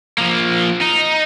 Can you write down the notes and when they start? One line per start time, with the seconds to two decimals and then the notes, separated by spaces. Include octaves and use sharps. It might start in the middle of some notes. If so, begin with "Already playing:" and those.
0.18 F3 A#3
0.81 D#4